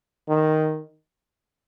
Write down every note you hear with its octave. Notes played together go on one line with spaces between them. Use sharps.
D#3